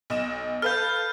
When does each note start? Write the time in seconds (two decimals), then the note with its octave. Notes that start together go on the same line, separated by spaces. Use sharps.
0.10 B1 D#5 E7
0.62 A4 B4 F5 F6 G6